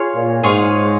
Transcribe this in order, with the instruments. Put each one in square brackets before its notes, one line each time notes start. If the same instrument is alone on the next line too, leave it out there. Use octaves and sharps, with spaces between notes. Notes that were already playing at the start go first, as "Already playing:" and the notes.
Already playing: [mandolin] F4 G#4 C#5 F5
[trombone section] A#2
[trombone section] G#2 [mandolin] F4 G#4 C#5 F5